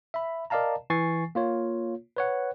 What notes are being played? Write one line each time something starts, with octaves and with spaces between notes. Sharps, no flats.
E5 B5
A#4 D5 D#5 F5 A5 A#5
E3 G#5 C#6 A6 C7
A#3 F4 C#5
B4 C#5 F#5